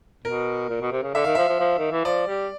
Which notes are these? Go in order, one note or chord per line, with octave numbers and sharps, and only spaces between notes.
B2 A#4
A#2
B2
C3
C#3
D3 E5
D#3 F5
F3 E5
F3
F3
D#3
E3
F3 D5
G3